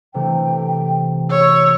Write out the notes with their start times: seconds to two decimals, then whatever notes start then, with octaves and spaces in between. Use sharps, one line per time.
0.14 C3 E3 A3 G5
1.31 C#5 E6